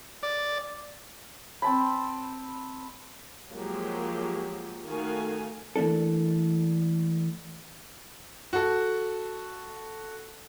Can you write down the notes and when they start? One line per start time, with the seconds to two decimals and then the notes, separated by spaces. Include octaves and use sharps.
0.23 D5
1.62 C4 A5 B5
3.51 F3 F#3 G#3 A#3 G4
4.85 D#3 A3 F#4 F5 G#5
5.76 E3 A3 A#3 D4 A4
8.53 F#4 A4